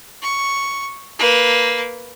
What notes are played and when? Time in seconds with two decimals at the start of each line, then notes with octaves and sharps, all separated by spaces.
0.22 C#6
1.19 A#3 B4